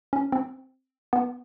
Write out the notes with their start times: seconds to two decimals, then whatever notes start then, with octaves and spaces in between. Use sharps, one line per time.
0.13 C#4
0.32 C4
1.13 B3